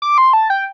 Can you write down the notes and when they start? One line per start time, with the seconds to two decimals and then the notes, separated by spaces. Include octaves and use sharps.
0.02 D6
0.18 C6
0.33 A5
0.50 G5